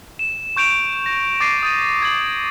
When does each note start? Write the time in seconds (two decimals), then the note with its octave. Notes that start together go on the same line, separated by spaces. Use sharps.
0.19 E7
0.56 C#6 G6 D7 F7
1.06 A#6
1.40 D6 A6 A#6 C7 D#7
1.63 D#6 G6 A6 D#7
2.02 G#6 A6 F#7